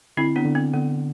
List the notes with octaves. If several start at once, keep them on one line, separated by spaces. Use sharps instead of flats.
D3 C4 E4
B3 D4
D3
C4
D3 B3